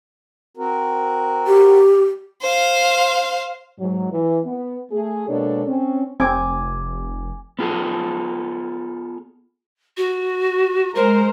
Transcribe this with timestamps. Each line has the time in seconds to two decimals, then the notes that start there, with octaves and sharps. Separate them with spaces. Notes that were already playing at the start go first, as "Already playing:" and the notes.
0.57 C4 F#4 A#4
1.47 G4
2.41 C5 F5
3.79 G#2 F#3
4.11 E3
4.45 B3
4.92 A3 G#4
5.28 B2 G#3 A#3 D4 A4 C#5
5.67 C4 C#4
6.20 F1 C4 G#5 D6 G#6
7.59 B3 F4 G#4 A4
9.97 F#4
10.95 G#3 A#4 C5 A#5